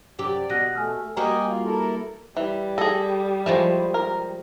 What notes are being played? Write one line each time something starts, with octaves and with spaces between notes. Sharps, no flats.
F#2 C3 G4 D5
B2 F#6 A#6 D#7
A3 G#5 E6 F6
G3 A#3 F#4 D#5 G5 G#5 A#5
F4
E4 A4 A#4
E3 G3
G#4 A4 D#5
F3 G#3 A3 E4
A#4